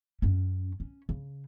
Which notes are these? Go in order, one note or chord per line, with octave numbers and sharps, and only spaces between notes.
F#2 C#4
C#4
C#3